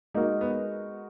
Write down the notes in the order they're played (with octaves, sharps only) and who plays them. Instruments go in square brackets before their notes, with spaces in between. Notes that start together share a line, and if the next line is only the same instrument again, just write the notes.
[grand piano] G#3 D#4 F#4 A#4 [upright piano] A#3
[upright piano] B3